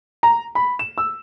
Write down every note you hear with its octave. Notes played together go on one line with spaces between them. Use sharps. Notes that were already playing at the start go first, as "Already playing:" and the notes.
A#5
B5
E7
E6